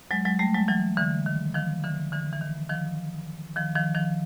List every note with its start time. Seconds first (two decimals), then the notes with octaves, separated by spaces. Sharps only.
0.11 F#3 G#3
0.25 F#3 G#3
0.39 G3 A3
0.54 F#3 G#3
0.68 E3 F#3
0.97 D3 E3
1.26 D#3
1.54 D#3 F3
1.84 D3 E3
2.12 D3 E3
2.33 E3
2.41 D#3
2.70 D#3 F3
3.56 D#3 F3
3.75 D#3 F3
3.95 D#3 F3